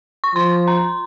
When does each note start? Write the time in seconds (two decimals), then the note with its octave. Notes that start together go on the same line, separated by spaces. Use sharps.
0.24 C#6
0.35 F3 C6
0.68 A#5